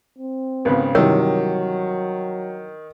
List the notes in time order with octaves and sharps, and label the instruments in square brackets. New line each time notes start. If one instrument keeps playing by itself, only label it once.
[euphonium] C4
[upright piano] G#1 C#3 [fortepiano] B3 B4
[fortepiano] G2 C3 E3 [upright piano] D#3 [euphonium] F#3 [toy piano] A#4 C#5